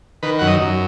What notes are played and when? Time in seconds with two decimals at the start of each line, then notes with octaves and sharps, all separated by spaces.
0.23 D#3 B4
0.39 F#2 F#5
0.47 D#5
0.61 F#2